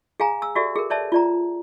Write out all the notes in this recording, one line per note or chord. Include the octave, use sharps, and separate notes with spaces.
G#4 F5 G#5 A#5
E6
F#4 G4 A4 D5 E5
G#4 A#4
B4 C#5 D5 E5 A5
F4 D5 A#5